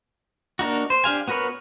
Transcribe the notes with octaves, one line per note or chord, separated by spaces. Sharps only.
A#3 D4 D#4 F#4
C5
D4 G4 F5 G#5
B3 F#4 A#4 B4 C#5